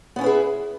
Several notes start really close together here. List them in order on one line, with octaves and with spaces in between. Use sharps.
B3 C#4 E4 B4 G#4